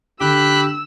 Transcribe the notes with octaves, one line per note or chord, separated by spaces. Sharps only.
D3 G4 B5 E6 F#6